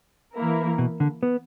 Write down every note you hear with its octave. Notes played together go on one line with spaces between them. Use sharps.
E3 A#3 E4 A#4
B2
D3
B3